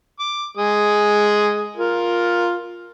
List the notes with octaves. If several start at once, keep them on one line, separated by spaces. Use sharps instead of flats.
D6
G#3 D#6
F4 A#4